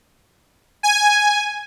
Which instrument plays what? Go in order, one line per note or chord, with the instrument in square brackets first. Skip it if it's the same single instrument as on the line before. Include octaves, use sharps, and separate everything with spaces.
[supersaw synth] G#5